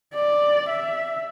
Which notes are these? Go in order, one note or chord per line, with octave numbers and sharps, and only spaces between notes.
D5
E5